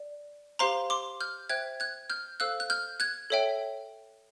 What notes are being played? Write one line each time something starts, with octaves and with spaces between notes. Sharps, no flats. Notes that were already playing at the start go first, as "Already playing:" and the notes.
Already playing: D5
G4 C5 F5 A#5 C6
C6 D6
F6 G6
C5 E5 G5 F#6 G#6
F#6 G#6
F6 G6
A4 C5 F5 E6 F#6
F#6
F6 G6
F#6 G#6
A4 C#5 E5 G5